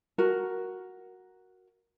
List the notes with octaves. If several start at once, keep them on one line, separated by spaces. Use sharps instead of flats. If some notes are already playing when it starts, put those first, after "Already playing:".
F#4 A#4